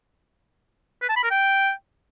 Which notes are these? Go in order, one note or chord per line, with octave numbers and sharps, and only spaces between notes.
B4
A5
B5
A#4
G5